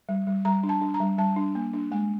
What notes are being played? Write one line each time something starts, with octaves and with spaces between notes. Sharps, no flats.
G3
G3
G3 A#5
D4
A5
D4
A#5
G3
G3 A5
D4
A#3
D4
G#3 G#5